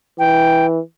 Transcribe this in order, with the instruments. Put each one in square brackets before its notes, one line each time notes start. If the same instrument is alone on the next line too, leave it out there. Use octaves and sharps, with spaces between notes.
[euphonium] E3 [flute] G5